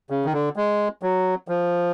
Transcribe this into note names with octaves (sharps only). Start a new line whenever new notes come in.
C#3
D#3
D3
G#3
F#3
F3